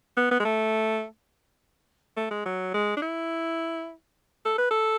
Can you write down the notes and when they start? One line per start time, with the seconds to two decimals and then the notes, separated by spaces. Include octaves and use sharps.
0.17 B3
0.31 B3
0.40 G#3
0.45 A3
2.17 A3
2.31 G#3
2.45 F#3
2.74 G#3
2.97 D4
3.02 E4
4.45 A4
4.58 B4
4.71 A4